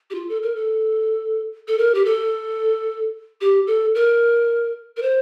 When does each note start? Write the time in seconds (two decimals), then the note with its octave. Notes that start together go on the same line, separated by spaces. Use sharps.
0.10 G4
0.15 F4
0.29 A4
0.43 A#4
0.56 A4
1.68 A4
1.78 A#4
1.95 G4
2.05 A4
3.41 G4
3.67 A4
3.95 A#4
4.97 A#4
5.02 C5